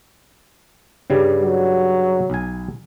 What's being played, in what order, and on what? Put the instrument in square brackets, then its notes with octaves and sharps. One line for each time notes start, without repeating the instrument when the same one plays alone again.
[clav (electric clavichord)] G2 C#3 G3
[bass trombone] F#3
[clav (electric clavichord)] B1 G#5